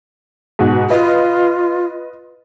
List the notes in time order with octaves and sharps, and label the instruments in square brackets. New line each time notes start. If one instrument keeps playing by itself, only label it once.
[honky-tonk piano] G#2 B2 F#4
[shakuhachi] F4 [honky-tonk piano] B4 D#5